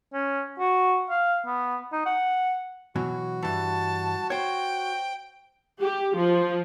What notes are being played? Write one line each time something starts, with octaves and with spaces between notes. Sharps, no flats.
C#4
F#4
F5
B3
D#4
F#5
B2 E3 F#3 F#4
G2 E3 A5
C5 C#5 G5
G4
F3